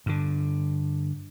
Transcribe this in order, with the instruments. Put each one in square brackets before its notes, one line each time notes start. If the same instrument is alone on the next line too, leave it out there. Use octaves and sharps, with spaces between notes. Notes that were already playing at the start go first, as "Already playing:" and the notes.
[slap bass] G2 D3